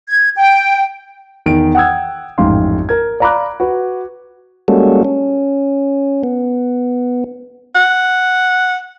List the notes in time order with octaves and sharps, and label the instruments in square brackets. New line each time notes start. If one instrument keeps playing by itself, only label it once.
[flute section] G#6
G5
[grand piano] E2 D#3 D7
F#5 G5 D#6 E6 G#6
A1 F2 G#2 F5 C6
A#4 G#6
D5 F5 A#5 B5 D6 F#6
F#4 B4
[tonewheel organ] G3 G#3 A#3 C#4 F#4 A4
C#4
B3
[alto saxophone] F#5